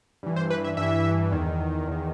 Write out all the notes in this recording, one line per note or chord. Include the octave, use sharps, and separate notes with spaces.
G2 E3
C5
B4
E5
G2 E3 E5
E2 D#3
E2 D#3